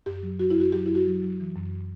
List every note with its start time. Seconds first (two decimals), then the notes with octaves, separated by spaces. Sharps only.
0.06 F#2 G4
0.23 F#3
0.39 F#3 F#4
0.50 E4
0.57 F#2 F#4
0.72 F#3 G4
0.86 F#2 E4
0.95 F#4
1.07 F#3
1.22 F#3
1.40 E3
1.56 F#2